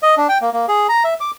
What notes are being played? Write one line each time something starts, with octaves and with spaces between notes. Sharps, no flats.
D#5
D4
G5
A#3
A#3
G#4
A#5
E5
D6